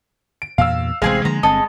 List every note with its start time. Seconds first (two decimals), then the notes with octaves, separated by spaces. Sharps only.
0.42 D7
0.58 E2 G2 A#2 F5 E6
1.02 A1 C3 G#3 C4 G#4 F5
1.25 D3 F3 A#3 A#5
1.43 G1 D3 C4 A4 D#5